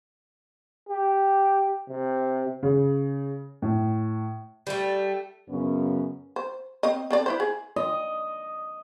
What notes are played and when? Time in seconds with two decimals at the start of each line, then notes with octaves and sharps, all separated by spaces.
0.89 G4
1.89 C3
2.63 C#3
3.62 A2
4.67 G3 A3
5.48 F#2 C#3 B3 C#4
6.36 C5
6.83 C4 D#5
7.10 C4 A4 D5
7.26 E4 B4 C5
7.40 G#4
7.76 D#5